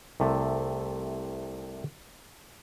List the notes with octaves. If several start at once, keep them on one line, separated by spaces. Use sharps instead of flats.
C2 C3 A3